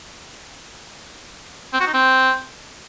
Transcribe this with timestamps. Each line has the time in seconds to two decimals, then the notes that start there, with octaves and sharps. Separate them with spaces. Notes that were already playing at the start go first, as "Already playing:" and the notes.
1.73 C4
1.80 F#4
1.87 D#4
1.94 C4